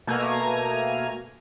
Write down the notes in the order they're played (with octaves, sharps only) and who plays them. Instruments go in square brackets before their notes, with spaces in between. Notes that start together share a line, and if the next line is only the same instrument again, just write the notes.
[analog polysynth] B2 A3 A#3 G#5 A#5 G#6